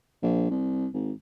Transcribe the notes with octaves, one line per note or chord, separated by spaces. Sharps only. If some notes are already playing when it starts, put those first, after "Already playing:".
A#1
C2
G#1